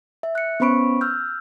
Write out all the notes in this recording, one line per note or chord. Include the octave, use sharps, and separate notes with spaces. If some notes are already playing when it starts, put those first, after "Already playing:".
E5
F#6 C#7
B3 C#4 C5 B5 C#6 D7
E6 F6 G6